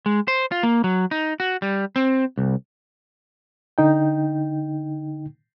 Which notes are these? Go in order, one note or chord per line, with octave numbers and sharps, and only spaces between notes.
G#3
C5
F4
A#3
F#3
D#4
F#4
G3
C4
C2
D3 D#4 G5